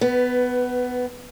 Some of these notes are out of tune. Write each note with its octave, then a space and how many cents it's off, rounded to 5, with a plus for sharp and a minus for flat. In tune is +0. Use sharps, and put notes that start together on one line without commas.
B3 +15 B4 +0